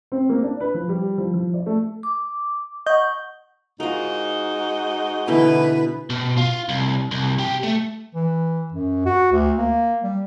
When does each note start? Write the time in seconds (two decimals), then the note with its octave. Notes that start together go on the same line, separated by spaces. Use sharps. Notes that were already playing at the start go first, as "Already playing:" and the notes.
0.12 C4
0.29 A#3
0.43 D4
0.60 B4
0.74 F3
0.89 G3
1.18 F3
1.34 F3
1.54 D5
1.66 A3
2.03 D6
2.86 D#5 F#5 C#6 G6
3.80 G#2 D#4 F4 F#4 A#4
5.28 B2 D3 E3 B4
6.10 B2
6.37 F4
6.69 C2
7.11 C2
7.38 C3 G4
7.63 A3
8.15 E3
8.72 F#2
9.06 F#4
9.32 D2
9.58 A#3
10.03 G3